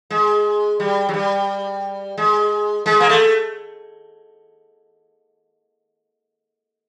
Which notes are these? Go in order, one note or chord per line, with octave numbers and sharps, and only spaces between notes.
G#3
G3
F#3
G3
G#3
G#3
A#3
A3